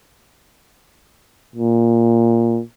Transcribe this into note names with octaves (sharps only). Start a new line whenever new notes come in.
A#2